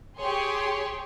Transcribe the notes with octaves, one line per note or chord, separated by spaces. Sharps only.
G4 G#4 C#5 C6